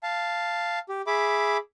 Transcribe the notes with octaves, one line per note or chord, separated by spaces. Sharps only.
F5 A5
G4
G#4 E5 B5 D6